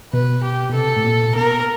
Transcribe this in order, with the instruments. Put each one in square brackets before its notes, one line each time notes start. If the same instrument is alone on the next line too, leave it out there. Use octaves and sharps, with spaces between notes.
[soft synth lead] B2 [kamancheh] B4
[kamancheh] G4
[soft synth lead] B2
[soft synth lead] C3 [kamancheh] A4
[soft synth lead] A2
A#2
[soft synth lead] B2 [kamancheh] A#4